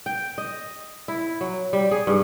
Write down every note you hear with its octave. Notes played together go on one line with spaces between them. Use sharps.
G5
D#5
E4
F#3
G3
G#4
G2